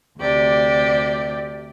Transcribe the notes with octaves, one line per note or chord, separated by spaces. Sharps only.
D2 C3 G4 D5